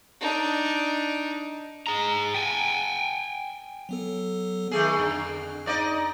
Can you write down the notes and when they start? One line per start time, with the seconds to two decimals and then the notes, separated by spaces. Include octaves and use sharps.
0.20 D4 D#4
1.87 G#4 A#5
2.34 G5 G#5
3.89 F#3 B3 A4
4.71 D#3 A3 G#4
4.98 F2 D3
5.66 D#4 D5 D#5